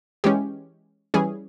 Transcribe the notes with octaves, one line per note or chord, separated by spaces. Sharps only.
E3 G#3 C#4 G4
E3 G3 C#4 G#4